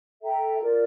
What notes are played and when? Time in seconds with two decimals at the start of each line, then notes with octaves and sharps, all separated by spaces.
0.22 A4 E5 G5 A#5
0.61 F4 A#4 D5